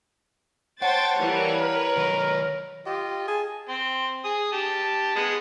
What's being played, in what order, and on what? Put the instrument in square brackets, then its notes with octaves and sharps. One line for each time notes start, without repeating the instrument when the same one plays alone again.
[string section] C5 G5 A6 [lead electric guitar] C#5 [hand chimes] F#5 A5
[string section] E3 G3 A#3
[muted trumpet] A#4 [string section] B4
[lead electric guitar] D#3 F#3 [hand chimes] C#5
[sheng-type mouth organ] F4 D#5 [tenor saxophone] G4
[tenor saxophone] G#4 [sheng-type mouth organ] A5
[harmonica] C4 C6
G#4 D#6
G4 A5
G#3 B3 D#6